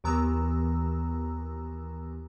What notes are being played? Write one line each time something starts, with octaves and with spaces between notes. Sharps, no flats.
D#2 E3 B3 A#5 E6